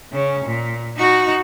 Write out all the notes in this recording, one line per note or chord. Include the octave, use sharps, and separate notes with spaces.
C#3 C#4
A#2
D#4 F#4